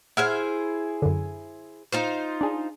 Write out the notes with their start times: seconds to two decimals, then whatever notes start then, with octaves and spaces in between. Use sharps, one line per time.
0.17 E4 G#4 C5 E5 F#5 F6
1.02 F#2 D3
1.92 D#4 F4 C5
2.41 D4 G#4